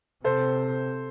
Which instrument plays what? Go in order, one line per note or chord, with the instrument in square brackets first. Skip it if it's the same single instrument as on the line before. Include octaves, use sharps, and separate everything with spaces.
[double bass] C3 [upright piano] A4 C5